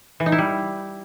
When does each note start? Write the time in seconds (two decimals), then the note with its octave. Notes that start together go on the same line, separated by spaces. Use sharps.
0.20 E3
0.26 D#4
0.32 E4
0.38 G3